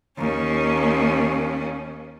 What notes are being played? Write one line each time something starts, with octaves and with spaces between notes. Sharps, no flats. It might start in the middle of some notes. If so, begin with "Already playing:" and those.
D#2 C#4